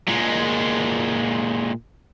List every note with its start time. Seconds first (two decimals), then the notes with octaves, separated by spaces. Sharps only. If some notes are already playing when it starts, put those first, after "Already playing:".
0.08 A#2 G#3